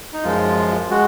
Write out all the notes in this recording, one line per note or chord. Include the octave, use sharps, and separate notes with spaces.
D#4
F#2 F3 G#3 F4
G#3 F#4